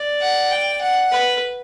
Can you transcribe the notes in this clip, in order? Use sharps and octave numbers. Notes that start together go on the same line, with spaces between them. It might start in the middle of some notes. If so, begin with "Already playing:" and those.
Already playing: D5
F#5
G5
F#5
B4